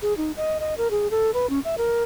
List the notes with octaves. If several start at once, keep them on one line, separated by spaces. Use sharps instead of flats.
G#4
D#4
D#5
D#5
A#4
G#4
A4
B4
C#4
E5
A#4